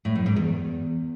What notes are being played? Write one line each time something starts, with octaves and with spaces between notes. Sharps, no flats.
A2
F#2
G#2
E2